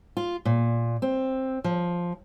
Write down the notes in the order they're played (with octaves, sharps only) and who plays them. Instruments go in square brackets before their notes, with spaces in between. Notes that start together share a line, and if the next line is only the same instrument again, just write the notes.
[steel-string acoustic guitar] F4
A#2
C4
F3